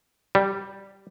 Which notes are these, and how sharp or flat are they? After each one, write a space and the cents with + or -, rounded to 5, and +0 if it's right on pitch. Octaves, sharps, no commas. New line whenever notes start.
G3 -5